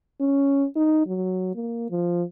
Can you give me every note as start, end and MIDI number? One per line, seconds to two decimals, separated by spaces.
0.20 0.66 61
0.76 1.06 63
1.07 1.54 54
1.55 1.90 58
1.90 2.23 53